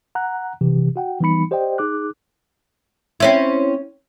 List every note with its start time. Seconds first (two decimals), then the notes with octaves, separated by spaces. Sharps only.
0.15 F#5 A#5 F#6
0.61 C3 E3 G4
0.96 F#4 F#5 G5
1.20 E3 G3 B3 D#4 B5 C#7
1.51 G4 C5 D5 D#5 G5
1.78 D#4 G#4 D6 F#6
3.20 C4 C#4 E4